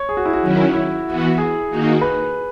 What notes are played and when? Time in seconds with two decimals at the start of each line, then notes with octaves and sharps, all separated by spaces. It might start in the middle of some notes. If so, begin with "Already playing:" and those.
Already playing: C#5
0.09 G#4
0.17 F#4
0.26 E4
0.33 F#4
0.42 D#3 F#3 C#4 E4
0.73 E4
1.06 E3 B3 F#4
1.38 G#4
1.69 D#3 A#3 D#4 F#4
2.01 B4